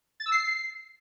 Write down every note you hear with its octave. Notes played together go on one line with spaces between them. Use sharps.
A6
E6
C7